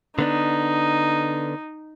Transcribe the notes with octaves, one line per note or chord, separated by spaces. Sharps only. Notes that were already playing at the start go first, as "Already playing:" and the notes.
D3 B3 D4 D#4